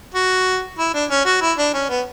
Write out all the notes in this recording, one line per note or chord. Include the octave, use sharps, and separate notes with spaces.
F#4
E4
D4
C#4
F#4
E4
D4
C#4
B3